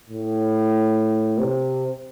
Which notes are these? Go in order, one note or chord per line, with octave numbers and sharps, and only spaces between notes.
A2
C3